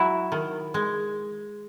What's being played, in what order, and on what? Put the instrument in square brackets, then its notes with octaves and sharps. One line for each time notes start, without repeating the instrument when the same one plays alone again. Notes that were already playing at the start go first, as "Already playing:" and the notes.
Already playing: [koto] F#3 E4 F#4
D#3
G#3